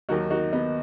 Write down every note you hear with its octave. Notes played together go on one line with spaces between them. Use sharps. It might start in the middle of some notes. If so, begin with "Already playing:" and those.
D#2 D#3 F#3 A#3 D#4 F#4
D#4 F#4
B3 D#4